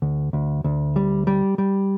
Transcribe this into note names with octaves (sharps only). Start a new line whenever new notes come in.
D2
D2
D2
G3
G3
G3